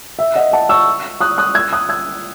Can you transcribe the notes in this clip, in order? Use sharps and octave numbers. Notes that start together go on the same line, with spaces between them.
E5
D#5 F#5
F#5 A5
C#6 E6
D#6 F#6
D#6 F#6
E6 G#6
D#6 F#6
E6 G#6